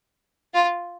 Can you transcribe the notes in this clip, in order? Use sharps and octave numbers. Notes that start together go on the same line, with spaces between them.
F4